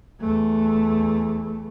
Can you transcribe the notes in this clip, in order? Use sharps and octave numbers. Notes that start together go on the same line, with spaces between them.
E2 A3